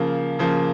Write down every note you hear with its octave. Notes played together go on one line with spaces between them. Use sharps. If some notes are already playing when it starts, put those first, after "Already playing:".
Already playing: C#3 F3 A#3
C#3 F3 A#3